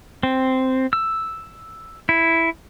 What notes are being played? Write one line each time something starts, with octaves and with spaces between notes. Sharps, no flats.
C4
E6
E4